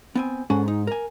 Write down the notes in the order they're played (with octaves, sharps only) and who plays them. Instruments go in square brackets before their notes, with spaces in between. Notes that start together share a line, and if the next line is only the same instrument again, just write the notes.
[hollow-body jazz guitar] B3 C4 G#5
[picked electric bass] G#2 G#3 [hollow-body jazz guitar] C#4 A4 F#5
[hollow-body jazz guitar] D#4
A#4 G#5